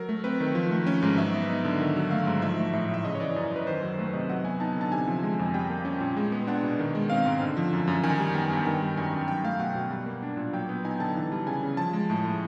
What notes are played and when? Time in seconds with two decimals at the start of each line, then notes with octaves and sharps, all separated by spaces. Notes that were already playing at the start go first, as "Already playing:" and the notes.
Already playing: F#3 A#4
0.09 A3
0.24 C4 B4
0.40 D#3
0.55 F3
0.71 A3
0.87 C#4
1.02 G#2
1.17 F#3 E5
1.34 B3
1.49 D#4
1.65 D3
1.80 D#3
1.96 F#3
2.11 A3 F5
2.27 G#2
2.42 F3 E5
2.59 A3
2.73 A2 E5
2.89 A2
2.94 E5
3.05 C#3 D#5
3.15 C#5
3.20 E3 D5
3.36 F#2
3.51 F#2 B4
3.67 D#3 C5
3.83 F#3
3.99 A3 B4
4.13 C3 D#5
4.30 F#3 F#5
4.45 B3 G#5
4.60 D#4 A5
4.76 D3 A5
4.92 C3 G#5
5.07 F3
5.23 G#3
5.39 F2
5.54 G3 G5
5.69 A#3
5.85 C#4
6.00 A#2
6.17 G#3
6.32 B3
6.47 D4 F#5
6.63 B2
6.79 D#3
6.95 G#3
7.10 C4 F5
7.25 G#2
7.41 D3
7.57 F3
7.73 F#2
7.88 F#2
8.03 D#3 G#5
8.19 G3
8.35 B3 G5
8.51 G2
8.65 D#3 G5
8.82 G3
8.97 F#2 G#5
9.13 F#2
9.28 F#3 G5
9.44 A3 F5
9.60 B2 F#5
9.75 B2
9.91 G3
10.06 A#3
10.22 D4
10.37 A#2
10.53 F#3 G5
10.69 B3
10.84 D#4 G#5
11.00 D3 A5
11.16 E3
11.32 G3
11.46 C#3 G#5
11.63 C#3
11.77 F3 A5
11.93 G#3
12.10 A2
12.25 A2